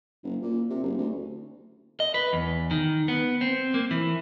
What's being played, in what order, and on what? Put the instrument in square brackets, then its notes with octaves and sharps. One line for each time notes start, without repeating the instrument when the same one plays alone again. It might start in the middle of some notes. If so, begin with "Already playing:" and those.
[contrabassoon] F#1
A#2
C3
F#1
D2
[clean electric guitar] D#5
B4
E2
D#3
B3
C4
A#3
E3